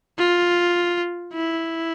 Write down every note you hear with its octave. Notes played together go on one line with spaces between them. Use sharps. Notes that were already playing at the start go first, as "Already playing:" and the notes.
F4
E4